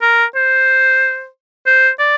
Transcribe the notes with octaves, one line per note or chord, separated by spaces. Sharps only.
A#4
C5
C5
D5